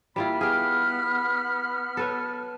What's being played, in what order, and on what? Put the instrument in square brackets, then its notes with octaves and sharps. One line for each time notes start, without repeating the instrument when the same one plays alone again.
[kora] G3 E4 F4 [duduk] A#3 [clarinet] B5
[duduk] B3 [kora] G4 G#4 [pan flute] F6
[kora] A4 B4 C#5